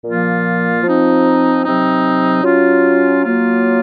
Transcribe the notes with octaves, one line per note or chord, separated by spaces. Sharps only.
A#2 F3 A#3 F4
F3 C4 D#4
C3 F#3 C4 D#4
F#3 C#4 F4
F#3 A#3 F4